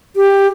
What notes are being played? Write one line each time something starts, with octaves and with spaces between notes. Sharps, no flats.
G4